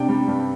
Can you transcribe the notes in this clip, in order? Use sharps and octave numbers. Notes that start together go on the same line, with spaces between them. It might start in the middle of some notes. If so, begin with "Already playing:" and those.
Already playing: C3 D4 G5
G3
G2